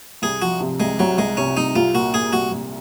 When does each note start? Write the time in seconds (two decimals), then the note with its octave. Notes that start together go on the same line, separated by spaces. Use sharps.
0.22 C2 G#4
0.42 F3 F#4
0.60 C3
0.80 C2 G#3
0.99 C2 F#3
1.18 C2 G#3
1.37 C3 C#4
1.57 C2 D#4
1.76 C2 F4
1.94 A#2 F#4
2.14 A#2 G#4
2.32 C2 F#4
2.52 C2